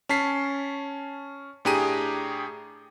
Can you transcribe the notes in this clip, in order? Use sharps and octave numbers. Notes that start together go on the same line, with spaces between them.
C#4 A5 B6 C7
A2 D4 G4 G#4 A#5 D#7